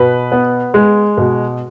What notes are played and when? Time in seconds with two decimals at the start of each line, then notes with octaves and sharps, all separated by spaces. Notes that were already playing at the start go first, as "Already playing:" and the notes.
Already playing: B2 B4
0.32 B3
0.74 G#3
1.17 B2